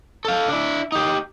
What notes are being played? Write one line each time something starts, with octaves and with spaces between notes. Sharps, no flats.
A4 F5
D4 E4
D#4 G4